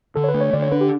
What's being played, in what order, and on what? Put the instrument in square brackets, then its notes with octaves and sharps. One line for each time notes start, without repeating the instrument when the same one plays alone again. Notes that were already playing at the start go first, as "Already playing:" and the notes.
[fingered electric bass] D3 [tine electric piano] A4
[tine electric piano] C#5
B4
[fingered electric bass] A3
[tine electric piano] C#5
[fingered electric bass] D3 [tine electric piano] D5
[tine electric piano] C#5
[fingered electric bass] D4 [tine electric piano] B4
[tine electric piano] G4